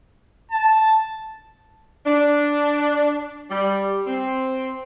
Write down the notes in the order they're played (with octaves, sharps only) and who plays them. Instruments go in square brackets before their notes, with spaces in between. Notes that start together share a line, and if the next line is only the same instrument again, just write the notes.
[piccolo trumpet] A5
[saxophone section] D4
G3
C4